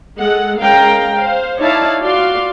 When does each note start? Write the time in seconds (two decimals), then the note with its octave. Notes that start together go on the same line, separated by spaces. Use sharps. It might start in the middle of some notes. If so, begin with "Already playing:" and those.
0.18 G#3 A4 F#5
0.60 G#3 C#4 A#4 F5 G5 A#5
1.16 C5 F5
1.59 D#4 E4 C#5 D5 F5 A5
2.01 F4 F#4 D5 F5 C6